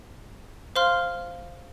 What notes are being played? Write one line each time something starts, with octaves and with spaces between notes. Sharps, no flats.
C5 F5 C6 F6